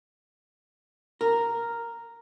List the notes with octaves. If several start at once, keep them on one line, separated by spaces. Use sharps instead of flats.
A#4